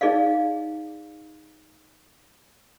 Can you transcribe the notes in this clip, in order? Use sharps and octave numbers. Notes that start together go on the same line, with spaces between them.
D#4 G#4 D5 D#5 F5